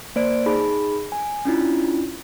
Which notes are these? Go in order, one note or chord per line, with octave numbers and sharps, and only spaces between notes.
A#3 C5 D5 D7
D#4 G#4 B5
G#5
C#4 D4 E4 F4